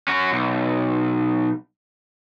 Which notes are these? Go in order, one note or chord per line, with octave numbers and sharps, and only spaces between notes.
C#4 F#4
B1